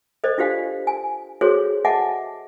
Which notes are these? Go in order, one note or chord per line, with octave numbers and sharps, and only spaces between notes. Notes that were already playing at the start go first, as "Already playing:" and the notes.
A4 C5 D5 D#5
D4 F4 G4 C5 F5 G#5
G#5
F#4 G#4 A4 C5 C#5
D#5 E5 F#5 G#5 A5 D6